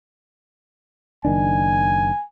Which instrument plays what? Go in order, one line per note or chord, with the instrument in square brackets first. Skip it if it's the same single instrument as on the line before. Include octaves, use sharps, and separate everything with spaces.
[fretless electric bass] F#1 D#3 D4 [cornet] G#5